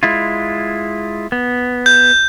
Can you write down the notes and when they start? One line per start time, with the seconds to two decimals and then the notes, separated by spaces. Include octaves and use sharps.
0.03 G#3 E4 F4
1.32 B3
1.86 G6